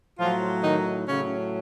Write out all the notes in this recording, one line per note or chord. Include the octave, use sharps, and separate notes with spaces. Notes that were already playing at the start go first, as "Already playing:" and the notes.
A2 F3 F#3 F4
D#3 D#4
A2 C#3 F#3 C#4